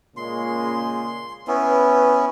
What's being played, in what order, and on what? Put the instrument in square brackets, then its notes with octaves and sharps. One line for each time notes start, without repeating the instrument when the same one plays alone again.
[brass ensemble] A#2 C#3 G#3 [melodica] C6
[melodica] B3 C#4 E4 [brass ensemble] B4